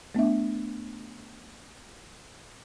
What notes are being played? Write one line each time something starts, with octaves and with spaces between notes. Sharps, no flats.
A3 B3 D4 E5